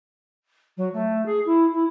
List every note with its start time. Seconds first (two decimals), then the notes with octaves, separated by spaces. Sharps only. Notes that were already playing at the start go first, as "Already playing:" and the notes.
0.77 F#3
0.93 A3
1.25 G#4
1.45 E4
1.72 E4